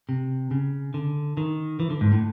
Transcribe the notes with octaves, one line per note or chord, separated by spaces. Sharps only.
C3
C#3
D3
D#3
E3
D3
G#2
A2